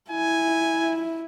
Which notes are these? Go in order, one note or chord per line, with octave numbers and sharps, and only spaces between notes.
E4 G#5